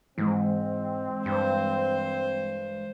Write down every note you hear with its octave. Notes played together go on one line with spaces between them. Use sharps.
G#2 E3 G#3 C4
G2 C5